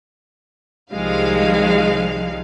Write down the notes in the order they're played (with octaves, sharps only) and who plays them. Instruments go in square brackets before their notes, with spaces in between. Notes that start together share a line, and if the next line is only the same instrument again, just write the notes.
[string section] C2 D#3 F3 G3 G#3 F5